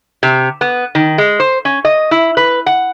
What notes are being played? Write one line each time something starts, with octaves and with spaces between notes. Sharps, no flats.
C3
B3
D#3
G#3
C5
C#4
D#5
E4
B4
F#5